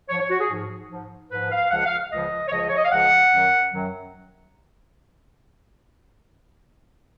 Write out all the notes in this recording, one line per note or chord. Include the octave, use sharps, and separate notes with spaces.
G#2 F3 C#5
C#5
F#4
G#4
G#2 F3
G#2 F3
G#2 F3 B4
F5
C#2 C#3 F3 F#5
F5
C#2 C#3 F3 D#5
C#5
C#2 C#3 F3 D#5
C#5
D#5
F5
C#2 C#3 F3 F#5
F#2 D#3 F#3
F#2 D#3 F#3